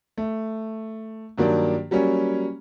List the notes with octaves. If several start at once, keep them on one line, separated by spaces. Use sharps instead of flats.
A3
G2 D#3 F#3 A#3 D4
F#3 G3 A#3 C#4